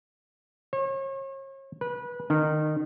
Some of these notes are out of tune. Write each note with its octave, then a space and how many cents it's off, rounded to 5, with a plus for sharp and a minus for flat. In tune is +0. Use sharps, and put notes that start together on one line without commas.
C#5 -40
B4 -25
D#3 -25